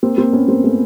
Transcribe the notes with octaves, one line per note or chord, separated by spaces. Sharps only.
A#3 C4
A#3 C4
B3 C#4
A#3 C4
A3 B3